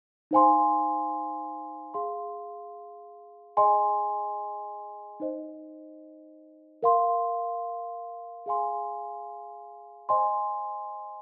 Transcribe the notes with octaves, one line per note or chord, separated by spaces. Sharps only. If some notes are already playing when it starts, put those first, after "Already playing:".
D#4 C5 F5 G#5 C6
G#4 F5 C6
G#4 D#5 G#5 C6
D#4 C5 D#5
A#4 F5 C6
G#4 F5 G#5 C6
C5 D#5 G#5 C6